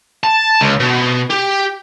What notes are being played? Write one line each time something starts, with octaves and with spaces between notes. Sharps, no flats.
A5
C#2
B2
G4